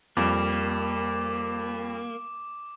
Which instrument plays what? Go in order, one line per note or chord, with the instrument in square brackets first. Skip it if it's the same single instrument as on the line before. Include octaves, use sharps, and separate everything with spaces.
[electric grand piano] F2 G3 [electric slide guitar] A#3 [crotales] D6